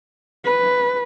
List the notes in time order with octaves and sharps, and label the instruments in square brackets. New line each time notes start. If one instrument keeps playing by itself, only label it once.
[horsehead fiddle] B4